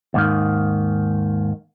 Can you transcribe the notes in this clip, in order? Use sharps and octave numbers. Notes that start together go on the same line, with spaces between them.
D#2 G#2 D#3